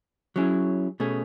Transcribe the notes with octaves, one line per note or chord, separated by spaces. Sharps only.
F#3 C#4 E4 G#4
B2 A3 C#4 G#4